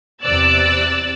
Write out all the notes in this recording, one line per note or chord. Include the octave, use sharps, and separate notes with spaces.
E2 C3 D5 E6 F#6 A6